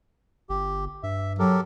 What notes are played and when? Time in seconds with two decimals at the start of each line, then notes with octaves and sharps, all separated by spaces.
0.49 G1 G4
1.03 G2 E5
1.39 F#3 G4 A4 A#4